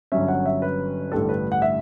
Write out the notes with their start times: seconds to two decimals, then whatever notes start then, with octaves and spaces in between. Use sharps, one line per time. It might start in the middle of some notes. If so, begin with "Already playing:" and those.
0.12 G1 G2 F#3 C#4 E5
0.28 F#5
0.46 E5
0.62 B4
1.12 A1 G2 D3 G3 A4
1.29 B4
1.52 F#5
1.62 E5